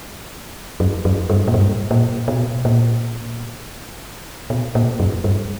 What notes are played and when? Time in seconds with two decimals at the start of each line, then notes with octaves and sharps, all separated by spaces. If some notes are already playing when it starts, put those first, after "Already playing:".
0.80 F#2
1.05 F#2
1.30 G2
1.48 A#2
1.54 G2
1.91 A#2
2.28 B2
2.65 A#2
4.50 B2
4.75 A#2
5.00 F#2
5.24 G2